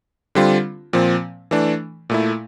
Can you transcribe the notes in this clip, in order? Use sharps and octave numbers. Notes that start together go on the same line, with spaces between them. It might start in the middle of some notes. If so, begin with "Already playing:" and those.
D3 G3 C4 F4
A#2 F3 C4
E3 A3 D4
A#2 A3 E4